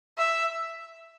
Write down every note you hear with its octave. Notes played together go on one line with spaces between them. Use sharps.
E5